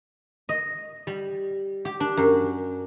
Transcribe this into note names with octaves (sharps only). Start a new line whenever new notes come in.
D#5
G3
G4
D4
F#2